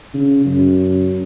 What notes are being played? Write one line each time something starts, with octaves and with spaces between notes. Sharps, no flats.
C#3
F#2